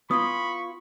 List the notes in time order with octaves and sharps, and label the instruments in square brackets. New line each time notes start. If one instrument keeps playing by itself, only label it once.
[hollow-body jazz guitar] B3 E4 F4 [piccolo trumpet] B5 [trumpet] C#6 [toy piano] D#6